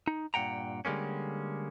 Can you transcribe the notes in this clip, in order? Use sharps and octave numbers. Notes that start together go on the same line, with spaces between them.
D#4
G2 A#2 F#5 G5 A#5
D3 G3 G#3 A#3 C#4